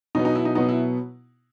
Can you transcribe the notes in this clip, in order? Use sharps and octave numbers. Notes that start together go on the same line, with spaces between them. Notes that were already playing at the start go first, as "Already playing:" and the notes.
B2 F#3 B3 D#4
D#4
E4
D#4
B2 F#3 B3 D#4
E4